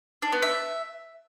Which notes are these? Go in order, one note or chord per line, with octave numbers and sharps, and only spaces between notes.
D4
B3
E5